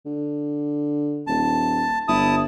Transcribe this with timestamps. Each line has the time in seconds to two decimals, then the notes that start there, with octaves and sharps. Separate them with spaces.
0.06 D3
1.27 D#1 A5
2.08 G1 E4 A5 D#6